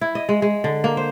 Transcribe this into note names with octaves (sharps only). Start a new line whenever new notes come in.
E4
D#5
G#3
G#3
D3
A#3
C5